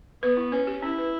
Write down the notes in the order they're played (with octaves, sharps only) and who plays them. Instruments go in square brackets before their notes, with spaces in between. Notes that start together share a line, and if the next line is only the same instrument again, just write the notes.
[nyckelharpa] B3 [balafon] B4
[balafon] E4
[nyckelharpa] C#4 [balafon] B4
[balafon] G4
[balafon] C#4 [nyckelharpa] E4
[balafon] B4